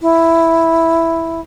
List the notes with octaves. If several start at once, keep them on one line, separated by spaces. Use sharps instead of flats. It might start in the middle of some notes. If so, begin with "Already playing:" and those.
E4